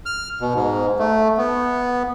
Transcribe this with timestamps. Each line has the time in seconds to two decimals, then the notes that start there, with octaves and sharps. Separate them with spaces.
0.06 F6
0.41 B2
0.55 G#2
0.99 A3
1.37 B3